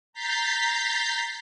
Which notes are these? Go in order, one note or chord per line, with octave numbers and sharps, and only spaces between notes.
A#5 G6 A6 B6 C7